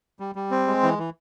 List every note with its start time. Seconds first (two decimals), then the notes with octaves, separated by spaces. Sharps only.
0.20 G3
0.35 G3
0.51 C4
0.67 G#3
0.83 E3
0.98 E3